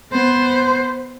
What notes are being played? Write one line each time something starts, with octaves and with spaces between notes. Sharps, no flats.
B3 C5